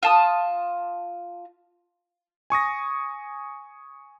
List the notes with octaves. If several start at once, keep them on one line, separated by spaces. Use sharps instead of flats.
F4 A5 D#6
G#5 C#6 D#6 A#6